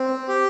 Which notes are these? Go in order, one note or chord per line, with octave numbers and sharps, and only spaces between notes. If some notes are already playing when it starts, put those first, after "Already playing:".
Already playing: C4
G4